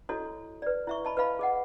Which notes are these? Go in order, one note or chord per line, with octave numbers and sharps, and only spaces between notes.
E4 F#4 A4 C#5 D#5
B4 D5
E4 E5 C#6
D#5 A5 B5
B4 D#5 F5 B5
G#4 D#5 F#5